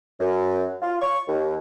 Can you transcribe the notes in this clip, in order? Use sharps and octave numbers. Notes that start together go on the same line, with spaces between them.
F#2
F4
C#6
D#2